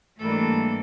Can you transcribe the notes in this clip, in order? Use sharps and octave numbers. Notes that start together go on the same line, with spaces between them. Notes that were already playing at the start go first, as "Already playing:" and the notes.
G#2 E3 G3 A3 A#3 D4 A4